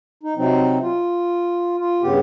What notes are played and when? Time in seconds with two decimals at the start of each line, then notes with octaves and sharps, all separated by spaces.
0.23 D#4
0.37 C3 F#3 C4 D#4
0.82 F4
1.78 F4
2.02 G2 C#3 B3 G4